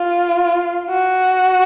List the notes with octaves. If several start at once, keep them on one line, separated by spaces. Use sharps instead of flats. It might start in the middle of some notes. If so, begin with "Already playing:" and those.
Already playing: F4
F#4